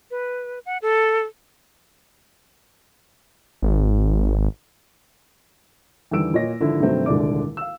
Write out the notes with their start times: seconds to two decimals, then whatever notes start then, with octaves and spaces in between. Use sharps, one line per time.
0.11 B4
0.66 F#5
0.82 A4
3.62 G#1
6.11 E2 D3 D#3 G3 E6 D7
6.34 A#2 F4 C#5 D#5 A#6
6.60 G#1 D3 F3 E4
6.80 G2 C3 D#3 F#3 A3 C4
7.06 D#1 C2 D3 G#3 D4 D6
7.57 F5 E6